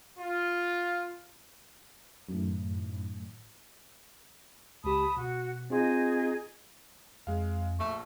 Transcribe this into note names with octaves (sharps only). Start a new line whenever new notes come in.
F4
F#2 A2 D#3 A3
C#2 G4 A5 B5 D#6
B2 F#4
C4 D#4 F4 G#4 D#5 C6
F2 G#3 F5
A#1 A3 C#6